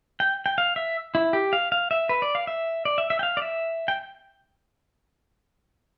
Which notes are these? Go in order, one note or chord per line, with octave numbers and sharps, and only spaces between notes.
G5
G5
F5
E5
E4
G4
F5
F5
E5
B4
D5
F5
E5
D5
E5
E5
G5
F5
D5
E5
G5